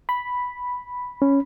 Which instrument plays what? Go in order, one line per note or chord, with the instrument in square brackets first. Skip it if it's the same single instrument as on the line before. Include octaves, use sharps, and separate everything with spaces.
[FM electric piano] B5
[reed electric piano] C#4